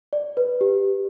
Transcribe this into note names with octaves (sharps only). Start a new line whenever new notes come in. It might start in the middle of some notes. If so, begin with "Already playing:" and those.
D5
B4
G4